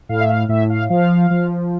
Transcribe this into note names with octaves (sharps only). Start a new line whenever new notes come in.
A2 F5
E5
F5
A2 E5
F5
F3 F5
F3